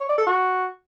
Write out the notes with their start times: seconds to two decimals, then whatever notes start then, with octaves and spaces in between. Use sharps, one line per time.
0.01 C#5
0.09 D5
0.18 A4
0.27 F#4